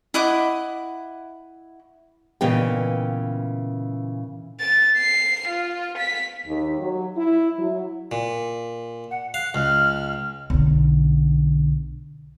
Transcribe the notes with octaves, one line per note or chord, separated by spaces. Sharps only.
E4 D#5 F#5 D6
A#2 C#3 E3 B3 D#5 G5
A6
C7
F4
B6
D#2
F#3
E4
F#3
A#2
F#5
F5 F#6
C#2 F6
B1 D3